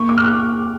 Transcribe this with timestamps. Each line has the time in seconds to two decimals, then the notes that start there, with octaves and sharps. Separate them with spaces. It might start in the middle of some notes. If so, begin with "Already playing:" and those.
Already playing: A#3 C#6
0.09 D6
0.18 F6
0.24 F#6